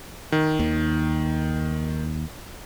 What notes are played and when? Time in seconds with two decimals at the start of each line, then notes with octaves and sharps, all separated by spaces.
0.32 D#3
0.59 D#2